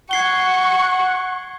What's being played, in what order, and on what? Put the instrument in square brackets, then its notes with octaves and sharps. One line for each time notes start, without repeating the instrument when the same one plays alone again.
[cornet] F#5 [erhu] C#6 [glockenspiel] G#6 C7 G7